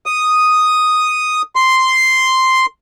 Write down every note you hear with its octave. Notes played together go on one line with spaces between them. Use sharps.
D#6
C6